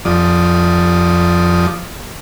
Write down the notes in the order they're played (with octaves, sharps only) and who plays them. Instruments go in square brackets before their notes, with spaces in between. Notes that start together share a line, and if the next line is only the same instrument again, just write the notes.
[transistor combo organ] F2 F3 D5 D#6